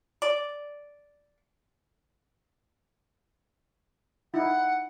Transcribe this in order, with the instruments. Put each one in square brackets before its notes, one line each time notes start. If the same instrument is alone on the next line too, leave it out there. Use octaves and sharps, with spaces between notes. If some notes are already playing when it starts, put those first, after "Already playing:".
[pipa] D5
[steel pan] D#4 E4 [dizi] F#5